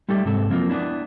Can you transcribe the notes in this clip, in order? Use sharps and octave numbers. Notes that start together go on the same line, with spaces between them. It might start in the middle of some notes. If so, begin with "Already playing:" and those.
G3 A3 D#4 G4 D5
G#2 C3 A4
F3 F#3 A#3 C4 F4
B3 D4 E4